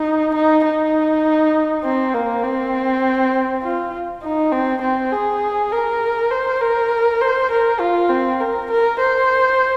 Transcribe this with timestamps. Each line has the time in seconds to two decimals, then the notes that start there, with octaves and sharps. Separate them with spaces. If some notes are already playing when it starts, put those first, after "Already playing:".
Already playing: D#4
0.35 D#4
0.65 D#4
1.84 C4
2.14 A#3
2.44 C4
3.63 F4
4.23 D#4
4.52 C4
4.82 C4
5.12 G#4
5.72 A#4
6.31 C5
6.61 A#4
7.21 C5
7.51 A#4
7.80 F4
8.10 C4
8.41 A#4
8.70 A#4
8.99 C5